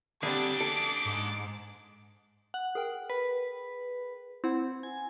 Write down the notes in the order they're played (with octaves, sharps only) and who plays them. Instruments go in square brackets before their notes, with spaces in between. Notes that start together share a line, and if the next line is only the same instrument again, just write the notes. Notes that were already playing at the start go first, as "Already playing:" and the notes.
[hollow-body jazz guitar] D3 G3 C4 [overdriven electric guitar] D4 G#4 [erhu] D6
[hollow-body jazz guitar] A4
[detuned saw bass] G#2
[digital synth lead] F#5
[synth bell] G#4 A#4 G5
[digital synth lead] B4
[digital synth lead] C4 [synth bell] E4 F#5
[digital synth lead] G#5